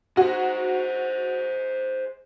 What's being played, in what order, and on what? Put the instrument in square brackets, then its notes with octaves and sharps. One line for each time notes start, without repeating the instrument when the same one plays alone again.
[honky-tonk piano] F#4 [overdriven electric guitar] G#4 C5